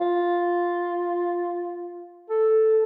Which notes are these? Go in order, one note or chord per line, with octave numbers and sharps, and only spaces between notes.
F4
A4